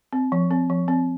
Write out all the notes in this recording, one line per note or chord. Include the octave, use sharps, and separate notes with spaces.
C4
F3
C4
F3
C4